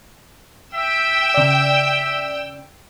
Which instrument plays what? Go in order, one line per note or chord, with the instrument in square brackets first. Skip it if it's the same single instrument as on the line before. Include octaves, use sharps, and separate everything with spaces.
[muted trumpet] E5 [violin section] G5 E6
[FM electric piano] C#3 D5